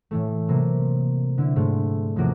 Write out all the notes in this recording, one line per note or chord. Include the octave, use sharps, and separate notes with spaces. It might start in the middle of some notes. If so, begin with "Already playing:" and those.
A2 E3 A3
C3 F#3 A#3
D3 E4
G#2 G#3 A3
D#1 C3 F3 A#3 F#4 D6